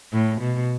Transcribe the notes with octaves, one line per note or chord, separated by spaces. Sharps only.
A2
B2